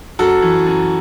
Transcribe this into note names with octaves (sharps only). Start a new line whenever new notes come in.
F#2 F#4 A4
E3
F#2